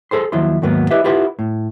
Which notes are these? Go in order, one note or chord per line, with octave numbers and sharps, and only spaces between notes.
G#4 A4 C5 C6
D#2 F3 F#3 E4 C6
D#2 G#2 F#3 A#3 B3
E4 G4 B4 D#5 E5
E4 F4 G4 B4 F#5
A2